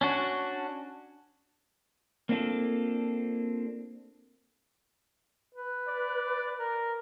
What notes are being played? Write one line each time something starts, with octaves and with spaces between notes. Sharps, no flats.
C#4 D4 F#4
A#3 C4 D4 F4 A4
B4
D5
A#4